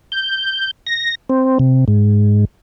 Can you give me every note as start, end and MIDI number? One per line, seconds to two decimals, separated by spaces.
0.12 0.71 91
0.87 1.15 94
1.30 1.58 60
1.59 1.85 48
1.88 2.45 44